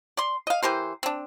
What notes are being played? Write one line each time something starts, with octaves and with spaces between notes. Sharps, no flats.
D5 C6
D#5 F5
E3 G4 A#4 C5
C4 D4